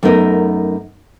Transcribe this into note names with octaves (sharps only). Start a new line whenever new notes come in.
F#2 A3 B3 D#4 A#4